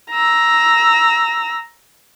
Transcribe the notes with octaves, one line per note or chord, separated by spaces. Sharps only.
A#5 E6